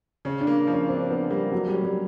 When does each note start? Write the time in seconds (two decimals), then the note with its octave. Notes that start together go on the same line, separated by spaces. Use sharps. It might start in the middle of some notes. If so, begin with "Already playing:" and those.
0.25 C#3 C#4
0.41 D4
0.47 A#3
0.67 F3
0.74 C#4
0.89 C4 D4
1.10 F3 B3
1.31 G3 A#3
1.52 F#3 A3
1.68 G3
1.74 C#4
1.84 G3